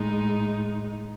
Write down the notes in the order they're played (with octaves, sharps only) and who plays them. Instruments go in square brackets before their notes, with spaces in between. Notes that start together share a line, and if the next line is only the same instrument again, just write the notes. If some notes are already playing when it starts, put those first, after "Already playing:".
Already playing: [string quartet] A2 G#3 D#4